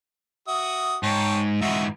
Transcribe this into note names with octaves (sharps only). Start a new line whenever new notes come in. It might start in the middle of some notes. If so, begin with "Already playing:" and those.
F#4 E5 D#6
G#2 C#5 G5 A5
G#2 E3 F#4 D#5 E5